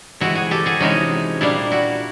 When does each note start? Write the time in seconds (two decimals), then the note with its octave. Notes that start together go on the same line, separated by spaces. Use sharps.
0.20 C3 E3 G#3 E4 F#4
0.35 F#4 G#4
0.51 G4 A4
0.66 F#4 G#4
0.80 C3 E3 G#3 C#4 D#4
1.41 A#2 G3 A#3 D4 E4
1.72 E4 F#4